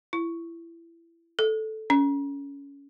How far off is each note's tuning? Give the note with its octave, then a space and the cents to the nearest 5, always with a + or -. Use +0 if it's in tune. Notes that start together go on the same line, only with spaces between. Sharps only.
E4 +25
A4 -5
C#4 +20